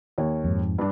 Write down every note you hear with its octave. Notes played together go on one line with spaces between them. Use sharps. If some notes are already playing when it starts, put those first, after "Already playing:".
D#2 C#5
F2 G#2
G2 D4